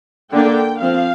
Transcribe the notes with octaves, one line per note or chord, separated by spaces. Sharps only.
D3 A#3 D4 G5
F3 C4 F5